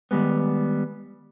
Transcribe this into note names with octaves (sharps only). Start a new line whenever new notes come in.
D#3 G3 G#3 B3